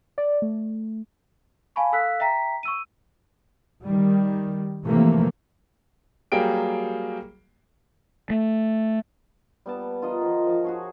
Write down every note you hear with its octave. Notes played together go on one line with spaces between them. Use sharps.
D5
A3
F5 G#5 A5 B5 C#6
A4 F5 E6 F#6 B6
E5 G5 A#5 B6
C#6 E6 D#7
D#3 G3
C3 E3 F3 A3 A#3
F#3 G3 A#3 G#4 G5 D7
A3
G3 B3 A5
F4 A#4 D#5 F#5
D#3 F3
F3 A5
F#4 G#4 C#5